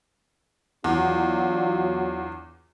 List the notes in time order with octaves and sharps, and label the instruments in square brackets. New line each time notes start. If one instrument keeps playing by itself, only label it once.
[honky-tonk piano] E2 [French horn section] F#3 D4 F4